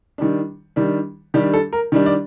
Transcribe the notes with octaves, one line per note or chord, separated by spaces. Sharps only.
D#3 G3 D4
D#3 G3 D4
D#3 G3 D4 G4
A4
A#4
D#3 G3 D4
D5